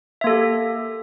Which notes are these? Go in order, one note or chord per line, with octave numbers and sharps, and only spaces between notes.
A#3 G4 A4 E5